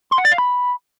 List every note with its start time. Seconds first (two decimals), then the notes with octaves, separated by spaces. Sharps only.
0.11 C6
0.18 F#5
0.25 D5
0.32 F5
0.38 B5